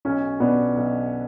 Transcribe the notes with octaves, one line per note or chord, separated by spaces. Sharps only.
B1 C#4
B2 B3 D4
B1